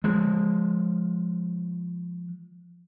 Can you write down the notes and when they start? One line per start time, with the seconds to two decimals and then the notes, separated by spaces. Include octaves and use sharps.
0.04 F3 G#3